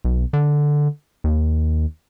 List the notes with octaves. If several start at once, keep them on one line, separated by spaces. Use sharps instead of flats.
B1
D3
D#2